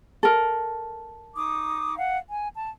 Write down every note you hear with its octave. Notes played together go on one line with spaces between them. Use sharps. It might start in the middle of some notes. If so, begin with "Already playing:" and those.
A4 A#4
D#4 D6 D#6
F5 F#5
G#5
A5